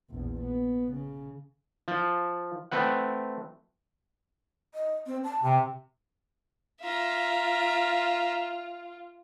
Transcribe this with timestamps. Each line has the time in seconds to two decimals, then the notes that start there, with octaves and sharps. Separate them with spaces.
0.10 A#1 E2
0.41 B3
0.92 C#3
1.88 F3
2.72 A3 C4 B4 F#5
4.74 D#5
5.07 C4
5.24 A5
5.43 C3 G5
6.83 F4 E5 A#5